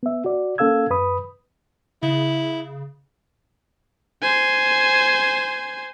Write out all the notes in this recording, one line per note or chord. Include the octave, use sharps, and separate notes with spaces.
B3 E5
F#4 D5
A#3 C#4 A4 F5 E6 G#6
F#2 B4 B5 D#6
C#3 E4
C5 G#5